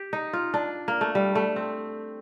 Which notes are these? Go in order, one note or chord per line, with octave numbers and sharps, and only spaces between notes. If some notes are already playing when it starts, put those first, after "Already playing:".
Already playing: G4
D#4
F4
D4
A#3
A3
G3
A3
C4